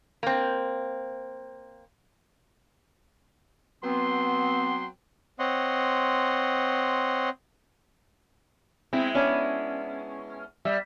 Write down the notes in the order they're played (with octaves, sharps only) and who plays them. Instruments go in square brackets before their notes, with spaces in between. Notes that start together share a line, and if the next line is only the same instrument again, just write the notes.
[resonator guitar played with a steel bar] A#3 C4
[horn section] F#3 G5 C6 [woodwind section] B3 C4
[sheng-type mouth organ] C4 C#5 D#5 F#5 C6
[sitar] G#3 E4 [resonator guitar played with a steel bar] C4
[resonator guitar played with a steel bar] B3 C#4 D4
[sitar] G3 [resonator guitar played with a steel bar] E5